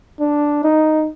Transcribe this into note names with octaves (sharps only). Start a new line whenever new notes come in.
D4
D#4